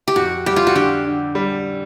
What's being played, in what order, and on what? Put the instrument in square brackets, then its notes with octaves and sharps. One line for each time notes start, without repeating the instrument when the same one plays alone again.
[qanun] G4
[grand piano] F2 [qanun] F#4
[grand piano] G3 [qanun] G4
[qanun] F4
F#4
[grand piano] D3 [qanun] G4
[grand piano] D3
G3